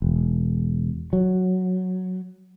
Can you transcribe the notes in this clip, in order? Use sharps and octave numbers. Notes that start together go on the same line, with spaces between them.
E1
F#3